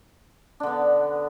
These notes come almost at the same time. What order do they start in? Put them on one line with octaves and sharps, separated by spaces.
D4 D3 B3